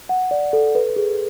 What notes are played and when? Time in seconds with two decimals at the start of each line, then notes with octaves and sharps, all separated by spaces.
0.09 F#5
0.31 D5
0.53 A4
0.75 B4
0.96 G#4